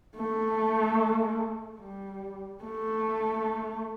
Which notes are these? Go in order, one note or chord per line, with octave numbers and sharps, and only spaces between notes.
A3
G3
A3